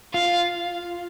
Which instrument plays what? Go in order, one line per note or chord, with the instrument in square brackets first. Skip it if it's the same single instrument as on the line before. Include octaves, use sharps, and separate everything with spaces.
[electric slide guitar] F4 [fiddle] F5